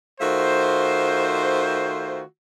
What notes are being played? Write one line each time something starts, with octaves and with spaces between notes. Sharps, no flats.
D#3 A3 F4 F#4 C5